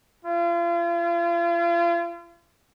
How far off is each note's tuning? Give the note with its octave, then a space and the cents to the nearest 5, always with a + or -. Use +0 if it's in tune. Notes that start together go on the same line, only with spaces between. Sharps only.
F4 -40